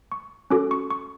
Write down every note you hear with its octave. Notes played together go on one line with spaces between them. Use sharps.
C#6
C#4 F#4 A4 D6
C#6
C#6